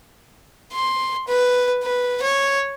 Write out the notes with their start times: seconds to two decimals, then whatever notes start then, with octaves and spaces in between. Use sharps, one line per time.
0.73 C6
1.28 B4
1.83 B4
2.22 C#5